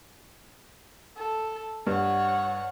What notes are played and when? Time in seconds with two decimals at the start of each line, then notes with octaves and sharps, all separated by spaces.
1.16 A4
1.87 G2 C#5 F#5